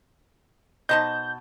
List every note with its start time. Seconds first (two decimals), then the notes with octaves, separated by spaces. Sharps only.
0.89 B2 D#4 C5 D#5 A5 G6